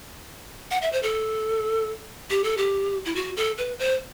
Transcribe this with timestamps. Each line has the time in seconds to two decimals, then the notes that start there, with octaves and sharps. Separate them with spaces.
0.71 F#5
0.82 E5
0.92 C5
1.03 A4
2.30 G4
2.44 A4
2.57 G4
3.05 E4
3.15 F#4
3.37 A4
3.58 B4
3.79 C5